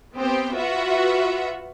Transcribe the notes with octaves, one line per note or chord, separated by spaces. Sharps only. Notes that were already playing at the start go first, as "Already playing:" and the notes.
B3 C4 G4 C5 G5
F4 F#4 B4 E5 F#5